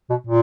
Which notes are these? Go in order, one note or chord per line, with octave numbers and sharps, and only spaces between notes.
B2
A#2